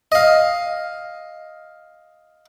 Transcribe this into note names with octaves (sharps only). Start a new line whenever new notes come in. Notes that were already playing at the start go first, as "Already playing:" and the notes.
D#5 F5